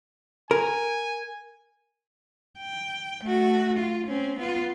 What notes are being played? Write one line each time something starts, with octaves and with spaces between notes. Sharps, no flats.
A#4 G#5
G5
A3 F#4
F4
C4 C#4
B3 F4